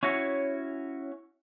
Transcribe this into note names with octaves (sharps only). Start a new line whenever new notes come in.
C#4 E4 F#4 C#5